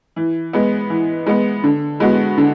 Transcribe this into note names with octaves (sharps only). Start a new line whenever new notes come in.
E3
G#3 B3
E3
G#3 B3
D3
G#3 B3 F#4
D3